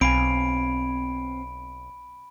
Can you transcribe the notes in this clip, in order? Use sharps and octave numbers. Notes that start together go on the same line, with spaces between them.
B1 C4 F5 G#5 B5 D7